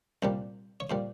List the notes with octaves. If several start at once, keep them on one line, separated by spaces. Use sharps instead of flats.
C2 A#2 G3 C5
C#5
A#2 G3 C5